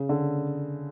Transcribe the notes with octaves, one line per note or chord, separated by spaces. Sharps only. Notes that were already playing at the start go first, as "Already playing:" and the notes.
Already playing: C#3
D3